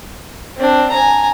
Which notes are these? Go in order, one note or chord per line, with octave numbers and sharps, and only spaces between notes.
C4 D4
G#5 A#5